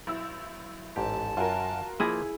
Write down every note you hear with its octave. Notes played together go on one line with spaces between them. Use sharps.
B1 E4 E6
A1 G#2 G4 A5
F#2 F4 F#4 A#4 G#5
F3 A#3 E4 G#4 D#5